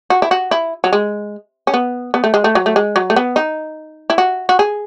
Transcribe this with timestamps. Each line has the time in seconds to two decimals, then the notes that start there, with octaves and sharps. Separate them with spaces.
0.10 F#4
0.22 E4
0.31 F#4
0.51 E4
0.84 F#3
0.93 G#3
1.67 C#4
1.74 B3
2.14 B3
2.24 A3
2.34 G#3
2.44 A3
2.55 F#3
2.66 A3
2.76 G#3
2.96 F#3
3.10 A3
3.16 B3
3.36 D#4
4.10 E4
4.18 F#4
4.49 F#4
4.59 G#4